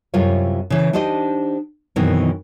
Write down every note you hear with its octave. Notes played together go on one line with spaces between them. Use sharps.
F#2 C3 G3 E4 F4 C#5
C#3 E3
D4 D#4 G4 C5 D#5
F#2 B2 D#3 E3 C4